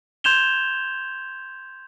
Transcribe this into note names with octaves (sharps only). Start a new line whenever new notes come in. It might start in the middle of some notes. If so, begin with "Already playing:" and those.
C6 G6 G#6 E7 F7 G7